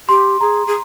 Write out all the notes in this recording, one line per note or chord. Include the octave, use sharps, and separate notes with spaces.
G4 C6
G#4 A#5
G#4